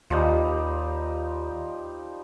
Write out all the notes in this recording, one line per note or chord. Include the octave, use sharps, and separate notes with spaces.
D#2 F3 G3 D#4